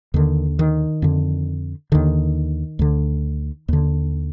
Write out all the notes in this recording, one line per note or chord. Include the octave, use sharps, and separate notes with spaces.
D#2 D3 D#3
D#3
F2 D3
D#2 D3 D#3
D2 D3
D#2 D3